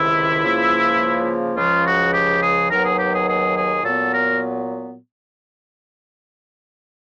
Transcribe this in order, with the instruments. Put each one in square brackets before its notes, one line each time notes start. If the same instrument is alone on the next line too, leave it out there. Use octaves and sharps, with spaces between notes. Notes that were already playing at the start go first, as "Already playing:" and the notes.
Already playing: [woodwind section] C#2 C3 D#3 E4
C#2 C#3 F3 A#3
C#2 C#3 F3 F4
F#4
G4
G#4
D#2 D#3 F#3 B3 A#4
G#4
G4
G#4
G#4
G#4
A#2 F#3 B3 A4
A#4